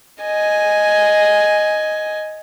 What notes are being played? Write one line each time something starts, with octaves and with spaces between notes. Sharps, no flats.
D#5 G#5